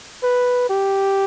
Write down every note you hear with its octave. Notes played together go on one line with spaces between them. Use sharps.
B4
G4